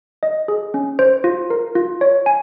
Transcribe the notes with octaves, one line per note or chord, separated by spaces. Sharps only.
D#5
G#4
C#4
C5
F4
A#4
F4
C#5
G#5